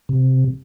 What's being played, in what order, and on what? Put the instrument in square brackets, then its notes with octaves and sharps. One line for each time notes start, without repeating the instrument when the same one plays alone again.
[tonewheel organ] C3